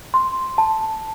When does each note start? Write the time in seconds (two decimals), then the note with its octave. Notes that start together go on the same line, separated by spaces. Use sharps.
0.14 C6
0.58 A5